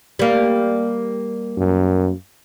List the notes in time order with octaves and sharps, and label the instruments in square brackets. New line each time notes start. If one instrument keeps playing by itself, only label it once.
[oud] G3 A#3
[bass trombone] F#2